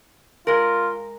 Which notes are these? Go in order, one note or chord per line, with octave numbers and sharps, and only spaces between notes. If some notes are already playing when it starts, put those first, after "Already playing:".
G#3 F4 A#4